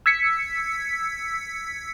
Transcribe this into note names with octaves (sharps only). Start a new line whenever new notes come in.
E6 G#6 B6 C#7